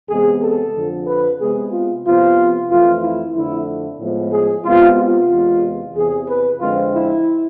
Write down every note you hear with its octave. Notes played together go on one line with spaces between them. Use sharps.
E2 C3 G#3 B3 G#4
A4
F2 D3 F3
B4
C3 G#3 B3 G#4
F4
C3 F3 B3 F4
F2 E3 A3 F4
E4
F2 D3 A3 E4
A2 F3 G#3 B3
G#4
C3 G#3 B3 F4
F4
E2 C3 G#3
E2 C3 E3 G#4
B4
F2 D3 G#3 C4 F4
E4